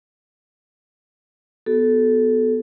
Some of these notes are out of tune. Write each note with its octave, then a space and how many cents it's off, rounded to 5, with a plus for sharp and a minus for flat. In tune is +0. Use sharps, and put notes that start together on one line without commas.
B3 +0 F#4 +35 A4 -10